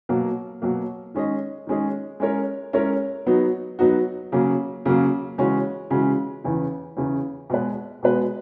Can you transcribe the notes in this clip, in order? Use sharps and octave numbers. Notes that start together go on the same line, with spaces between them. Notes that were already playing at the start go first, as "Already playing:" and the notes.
B2 F#3 A#3
B2 F#3 A#3
D#3 G#3 C#4 G#4 D#5
D#3 G#3 C#4 G#4 D#5
G#3 C#4 E4 A#4 C#5
G#3 C#4 E4 A#4 C#5
F#3 B3 D#4 F#4
F#3 B3 D#4 F#4
C#3 F#3 A#3
C#3 F#3 A#3
C#3 E3 G#3 C#4 F#4
C#3 E3 G#3 C#4 F#4
E2 C#3 E3
E2 C#3 E3
B2 G#3 B3 F#4 B4
B2 G#3 B3 F#4 B4